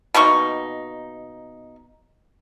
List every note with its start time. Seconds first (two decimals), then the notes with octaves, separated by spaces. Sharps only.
0.14 B2 A#3 D#4 C#6